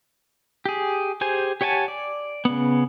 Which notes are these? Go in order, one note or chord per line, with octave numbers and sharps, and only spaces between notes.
G4 G#4
G4 G#4 C5 G#5
G4 C#5 F#5 G#5 A5
D5
C#3 B3